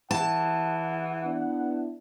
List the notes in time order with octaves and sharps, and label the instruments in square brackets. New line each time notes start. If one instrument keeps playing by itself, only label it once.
[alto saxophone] E3 [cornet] F#5 [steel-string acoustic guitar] A5
[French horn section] B3 D4 E4